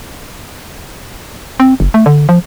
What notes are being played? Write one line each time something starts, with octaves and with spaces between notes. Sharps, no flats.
C4
F#1
A3
D3
F3